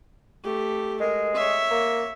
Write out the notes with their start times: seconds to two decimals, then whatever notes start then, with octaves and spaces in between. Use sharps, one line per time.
0.44 A3 G4
1.00 G#3 A#4
1.35 C#5 E5
1.71 A#3